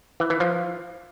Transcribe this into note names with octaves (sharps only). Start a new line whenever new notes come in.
E3
E3
F3